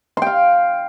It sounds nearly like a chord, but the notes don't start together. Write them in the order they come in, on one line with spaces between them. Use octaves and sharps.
C6 G5 F5